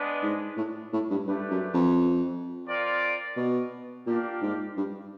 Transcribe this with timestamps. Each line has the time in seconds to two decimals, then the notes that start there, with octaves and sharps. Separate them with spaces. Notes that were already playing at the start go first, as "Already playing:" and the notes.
Already playing: G#3 B3 D4
0.23 G#2
0.57 A2
0.93 A2
1.10 G2
1.27 G2 A3 D4 G4 B4
1.50 F#2
1.74 F2
2.67 C4 F4 A#4 D5
3.37 B2
4.06 A#2 D4 G4 A#4 D5 F5
4.42 G#2
4.77 G2